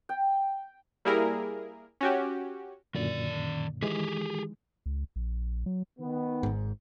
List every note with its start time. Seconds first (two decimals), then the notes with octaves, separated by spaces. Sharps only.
0.09 G5
1.05 G3 A#3 E4 G#4 A#4
2.01 C#4 F#4 G4
2.95 F#2 A#2 D3 D#3 D5
3.83 D#3 E3 G#3 G4 G#4
4.86 C#2
5.16 A#1
5.66 F#3
5.99 D#3 B3
6.43 G#1 G#2